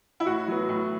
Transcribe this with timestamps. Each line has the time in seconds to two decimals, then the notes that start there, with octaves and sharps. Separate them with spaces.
0.20 E4
0.26 A2 F#4
0.48 F#3 B3
0.69 A2